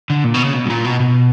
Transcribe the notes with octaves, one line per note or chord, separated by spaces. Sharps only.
D3
A#2
B2
C#3
B2
G2
A#2
B2
B2